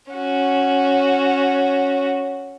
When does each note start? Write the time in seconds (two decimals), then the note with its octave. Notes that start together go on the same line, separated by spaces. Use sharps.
0.11 C#4 F#4